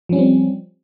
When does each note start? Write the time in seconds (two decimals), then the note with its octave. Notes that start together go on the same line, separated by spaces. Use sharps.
0.09 F3
0.13 C#4
0.16 G3
0.19 C4